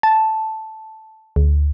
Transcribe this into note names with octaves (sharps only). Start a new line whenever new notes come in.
A5
D2